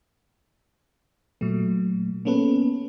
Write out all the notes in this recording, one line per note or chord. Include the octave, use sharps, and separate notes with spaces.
A#2 F#3 A3
A#3 B3 C#4 A4 B4